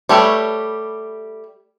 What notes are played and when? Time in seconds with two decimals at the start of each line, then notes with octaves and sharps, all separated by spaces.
0.09 G3 A3 G4 B4 C#5